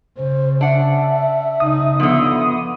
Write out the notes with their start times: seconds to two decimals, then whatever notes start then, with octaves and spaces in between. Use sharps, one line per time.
0.17 C#3 C5
0.61 D4 E5 F#5
1.60 C#3 D#4 D#6
2.00 D3 F3 B3